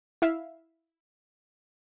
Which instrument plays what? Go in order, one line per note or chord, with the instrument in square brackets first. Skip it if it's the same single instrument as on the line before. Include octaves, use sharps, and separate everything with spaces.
[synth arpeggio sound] E4 E5 F5